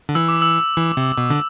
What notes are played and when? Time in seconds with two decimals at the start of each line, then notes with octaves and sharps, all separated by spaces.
0.09 D3
0.15 E3 E6
0.28 D6
0.42 E6
0.77 E3
0.97 C3
1.18 B2
1.30 D3